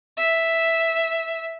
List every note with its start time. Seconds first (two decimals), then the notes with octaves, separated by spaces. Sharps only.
0.17 E5